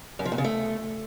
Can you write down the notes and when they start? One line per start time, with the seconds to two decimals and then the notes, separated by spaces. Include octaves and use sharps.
0.19 F#2
0.25 F3
0.32 A#2
0.38 C#3
0.44 A3